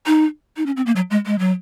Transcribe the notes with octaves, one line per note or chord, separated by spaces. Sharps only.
D#4
D#4
C#4
C4
A#3
F#3
G#3
G#3
F#3